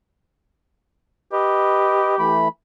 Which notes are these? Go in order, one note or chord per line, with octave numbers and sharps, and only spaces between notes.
G4 B4 D#5
E3 A3 B5